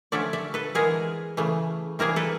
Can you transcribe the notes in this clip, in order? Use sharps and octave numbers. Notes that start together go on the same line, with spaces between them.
D3 F3 A3 C#4 D5 E5
D5 E5
A4 B4
E3 G#3 B3 G#4 A#4
C#3 E3 A3
C3 E3 G3 A#3 G#4 A#4
A4 B4